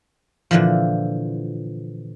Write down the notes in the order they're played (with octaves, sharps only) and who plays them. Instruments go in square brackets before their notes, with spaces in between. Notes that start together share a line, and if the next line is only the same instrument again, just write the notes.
[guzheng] A#2 D3 E3 F3